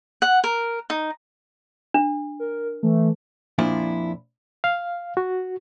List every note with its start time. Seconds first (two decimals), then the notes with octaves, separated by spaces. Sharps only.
0.22 F#5
0.44 A#4
0.90 D#4
1.94 D4
2.40 A#4
2.83 E3 A3
3.58 F2 A#2 F3 D4 E4
4.64 F5
5.17 F#4